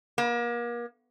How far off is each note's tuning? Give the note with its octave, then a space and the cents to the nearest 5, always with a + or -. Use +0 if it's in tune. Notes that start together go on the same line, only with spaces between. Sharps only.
A#3 +35